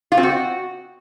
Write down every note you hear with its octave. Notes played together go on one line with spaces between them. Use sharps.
F4
C4
F#4